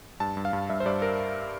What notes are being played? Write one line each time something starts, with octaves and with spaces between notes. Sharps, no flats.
G2 A5
G2
F5
G2
G2 E5
C5
G2 D5
A#4